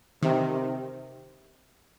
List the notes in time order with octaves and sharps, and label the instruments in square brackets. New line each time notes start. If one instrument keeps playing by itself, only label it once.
[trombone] C3 [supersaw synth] D#3
[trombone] C3